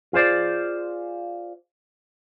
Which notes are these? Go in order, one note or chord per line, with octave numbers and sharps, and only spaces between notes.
F4 G#4 C5 D5